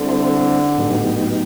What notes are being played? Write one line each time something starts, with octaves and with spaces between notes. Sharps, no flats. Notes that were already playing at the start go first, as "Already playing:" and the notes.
Already playing: D3 G3 C4 E4 A4 C5
A2 F#3 B3 D#4 G4